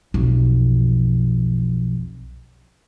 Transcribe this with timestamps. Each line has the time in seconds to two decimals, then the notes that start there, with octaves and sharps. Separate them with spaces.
0.14 B1 F2